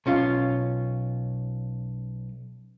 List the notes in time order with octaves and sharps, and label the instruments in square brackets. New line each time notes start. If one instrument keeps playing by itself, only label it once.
[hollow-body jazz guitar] B1 C#4 F4